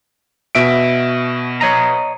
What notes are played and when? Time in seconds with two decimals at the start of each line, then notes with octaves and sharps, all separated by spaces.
0.55 B2 E5 D7
1.61 C#5 D#5 A#5